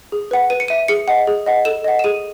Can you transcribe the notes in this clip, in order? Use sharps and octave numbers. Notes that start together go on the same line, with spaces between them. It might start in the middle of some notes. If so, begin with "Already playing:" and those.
G#4
B4 F#5
B4 D#7
C#7
E5 D#7
G#4 C#7
D#5 F#5
G#4
D#5 F#5
A4 E7
D#5 F#5
E7
G#4 D#7